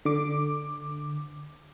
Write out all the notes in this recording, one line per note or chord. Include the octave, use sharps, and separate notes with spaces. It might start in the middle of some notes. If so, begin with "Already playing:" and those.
D3 D6